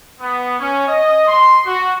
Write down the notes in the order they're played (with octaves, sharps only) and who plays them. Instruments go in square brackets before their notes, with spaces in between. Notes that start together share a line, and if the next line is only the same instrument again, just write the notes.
[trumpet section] B3
C#4
D#5
C6
F#4